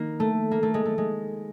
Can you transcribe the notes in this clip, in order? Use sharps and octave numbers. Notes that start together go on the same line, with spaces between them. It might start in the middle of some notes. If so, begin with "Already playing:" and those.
Already playing: D#3 A#3
A3
A#3
A3
G#3
A3
G#3